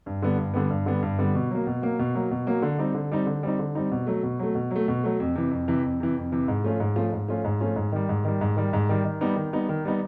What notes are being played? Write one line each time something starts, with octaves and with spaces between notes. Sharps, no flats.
G2
D3 G3 B3
G2
D3 G3 B3
G2
D3 G3 B3
G2
D3 G3 B3
B2
F#3 A#3
B2
F#3 A#3
B2
F#3 A#3
B2
F#3 A#3
D3
G3 C4 D#4
D3
G3 C4 D#4
D3
G3 C4 D#4
D3
G3 C4 D#4
B2
F#3 A3
B2
F#3 A3
B2
F#3 A3
B2
F#3 A3
F2
C3 E3
F2
C3 E3
F2
C3 E3
F2
C3 E3
G#2
F3 A3 C#4 F4
G#2
F3 A3 C#4 F4
G#2
F3 A3 C#4 F4
G#2
F3 A3 C#4 F4
G#2
D#3 G3
G#2
D#3 G3
G#2
D#3 G3
G#2
D#3 G3
D#3
G3 B3 D#4
D#3
G3 B3 D#4
D#3
G3 B3 D#4